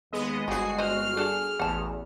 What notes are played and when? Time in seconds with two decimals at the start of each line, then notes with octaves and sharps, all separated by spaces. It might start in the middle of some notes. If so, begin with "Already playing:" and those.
0.13 D#2 G#3 B3 D#5
0.48 G1 F3 G#3 B3 F#4 G#4 C7
0.78 B4 C5 D#5 F6
1.17 D4 G#4 A4
1.60 A1 E2 F#5 A5